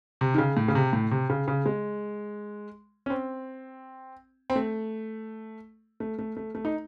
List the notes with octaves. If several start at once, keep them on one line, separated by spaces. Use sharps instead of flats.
C3
D#3
C#3
A2
C#3
C3
A2
C3
C#3
C#3
G#3
C#4
C4
C4
A3
A3
A3
A3
A3
D#4